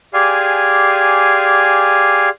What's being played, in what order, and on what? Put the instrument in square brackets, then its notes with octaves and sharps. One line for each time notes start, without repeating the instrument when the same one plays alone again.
[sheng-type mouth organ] G4 G#4 D5 F5 G#5 C6